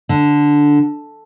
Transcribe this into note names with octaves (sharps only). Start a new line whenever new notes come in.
D3